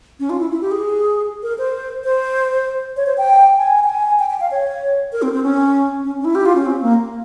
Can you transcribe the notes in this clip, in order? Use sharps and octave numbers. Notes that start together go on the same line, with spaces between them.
C#4
F4
E4
E4
G4
G#4
A#4
C5
C5
C#5
C5
G5
G#5
G5
G#5
G5
G5
F5
C#5
A#4
C4
C4
C#4
C#4
C#4
E4
G4
F4
C#4
C4
A#3